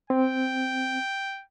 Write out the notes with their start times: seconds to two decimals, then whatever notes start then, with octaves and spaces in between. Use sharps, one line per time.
0.10 C4 G5